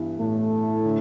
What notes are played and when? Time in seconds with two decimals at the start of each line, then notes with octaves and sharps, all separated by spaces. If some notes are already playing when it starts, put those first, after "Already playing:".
Already playing: G2 E3 B3 E4
0.20 A2 A3
0.85 D3